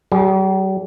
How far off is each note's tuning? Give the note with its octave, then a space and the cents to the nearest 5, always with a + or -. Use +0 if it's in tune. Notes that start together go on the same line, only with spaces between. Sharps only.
G3 -45 G#4 +0